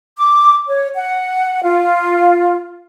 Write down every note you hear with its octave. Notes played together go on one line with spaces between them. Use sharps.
D6
C#5
F#5
F4